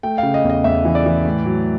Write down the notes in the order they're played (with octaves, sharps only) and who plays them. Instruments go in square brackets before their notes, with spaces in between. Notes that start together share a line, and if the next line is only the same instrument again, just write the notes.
[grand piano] A3 G5
C#3 F5
D#5
E2
D#5
E2 E5
E3
D5
E3
A2
F#3